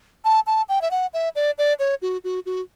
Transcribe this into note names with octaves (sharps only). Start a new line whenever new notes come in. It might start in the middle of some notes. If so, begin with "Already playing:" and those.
A5
A5
G5
E5
F#5
E5
D5
D5
C#5
F#4
F#4
F#4